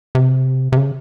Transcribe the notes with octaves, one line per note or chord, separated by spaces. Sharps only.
C3
C3
C#3